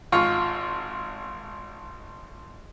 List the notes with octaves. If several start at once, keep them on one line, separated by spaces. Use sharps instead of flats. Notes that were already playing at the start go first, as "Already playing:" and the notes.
G#1 F4 F5 C#6